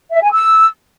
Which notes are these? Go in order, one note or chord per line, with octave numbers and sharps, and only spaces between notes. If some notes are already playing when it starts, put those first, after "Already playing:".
E5
G#5
E6